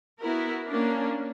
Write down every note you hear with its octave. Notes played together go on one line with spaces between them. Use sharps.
B3 E4 F#4 A#4
A#3 C#4 D4